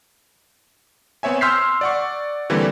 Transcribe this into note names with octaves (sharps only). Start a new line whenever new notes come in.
B3 C4 C#5 E5 G#5
C6 E6 F6 G6 B6 C7
D5 F#5 C#6
D3 E3 G3 A#3 C4